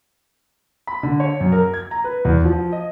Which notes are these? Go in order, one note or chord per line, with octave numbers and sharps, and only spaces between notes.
B5
D3
C#5
F#2
A#4
G#6
A#5
B4
E2
F3
D#5